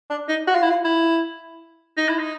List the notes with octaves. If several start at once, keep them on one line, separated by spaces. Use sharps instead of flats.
D4
D#4
F#4
F4
E4
F4
E4
D#4
E4
D#4